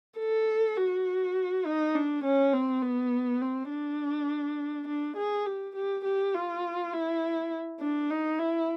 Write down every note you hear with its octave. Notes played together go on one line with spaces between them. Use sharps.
A4
F#4
D#4
D4
C#4
C4
B3
C4
D4
D4
G#4
G4
G4
G4
F4
E4
D4
D#4
E4